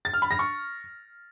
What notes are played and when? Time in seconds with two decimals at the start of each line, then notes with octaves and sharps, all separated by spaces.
0.05 A6
0.14 F6
0.22 B5
0.31 A#6
0.39 C#6